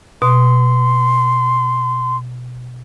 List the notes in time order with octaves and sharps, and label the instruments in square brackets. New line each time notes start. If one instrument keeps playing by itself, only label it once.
[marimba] B2 [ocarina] C6